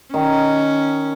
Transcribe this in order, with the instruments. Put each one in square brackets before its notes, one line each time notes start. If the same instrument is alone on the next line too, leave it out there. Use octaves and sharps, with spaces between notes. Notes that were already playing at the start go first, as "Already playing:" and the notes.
[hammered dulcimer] D#3 [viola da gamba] C#4